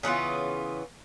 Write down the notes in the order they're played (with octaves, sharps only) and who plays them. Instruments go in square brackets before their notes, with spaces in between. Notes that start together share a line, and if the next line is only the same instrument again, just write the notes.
[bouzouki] C#3 E3 B3 F4